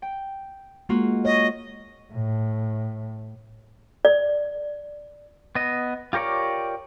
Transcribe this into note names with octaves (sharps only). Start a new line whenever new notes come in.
G5
G#3 A#3 F4 F#4
C#5 D#5
A2
D5
B3 D#5
F4 G4 A#4 C#5 D5